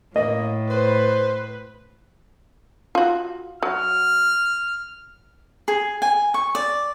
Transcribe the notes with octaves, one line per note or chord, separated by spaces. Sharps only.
A2 A#3 D#5
B4 C5
F4 F#4
F#3 F6
G#4
G#5
C#6
D5